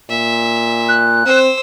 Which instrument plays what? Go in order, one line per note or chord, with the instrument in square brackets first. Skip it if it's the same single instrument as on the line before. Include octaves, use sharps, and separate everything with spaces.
[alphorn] A#2 [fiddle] E5
[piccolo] F#6
[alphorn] C4 [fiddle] C5 E6